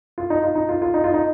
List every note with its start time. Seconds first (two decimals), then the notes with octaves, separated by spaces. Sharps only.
0.18 F4
0.30 D#4
0.43 F4
0.55 D#4
0.69 F4
0.82 F4
0.94 D#4
1.04 F4
1.14 D#4